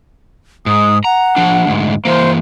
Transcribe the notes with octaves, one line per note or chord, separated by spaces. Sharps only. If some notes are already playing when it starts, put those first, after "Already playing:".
G#2 D#6
F#5 A#5
F3 D4
D2 G#2
E3 A#3 C5